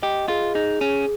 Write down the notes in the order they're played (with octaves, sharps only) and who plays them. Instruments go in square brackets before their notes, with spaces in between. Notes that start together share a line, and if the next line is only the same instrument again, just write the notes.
[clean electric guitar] G4 [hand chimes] D#5
[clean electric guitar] F4 [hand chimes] G#4
[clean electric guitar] D#4 [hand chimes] G#4
[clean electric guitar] C#4 [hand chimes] G#4